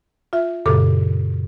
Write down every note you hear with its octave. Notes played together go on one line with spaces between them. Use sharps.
F4 E5
F#2 A#2 C#3 G4 A4 D6